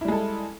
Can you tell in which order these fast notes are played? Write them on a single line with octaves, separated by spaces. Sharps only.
E4 G3 G#3 A4